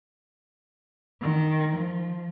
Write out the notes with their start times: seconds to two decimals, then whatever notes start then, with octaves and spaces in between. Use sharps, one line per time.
1.22 D#3
1.76 F3